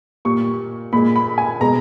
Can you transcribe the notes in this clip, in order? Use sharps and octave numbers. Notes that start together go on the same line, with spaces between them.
A#2 G3 C#6
A#2 G#3 B5
B5
G#5
B2 G#3 A#5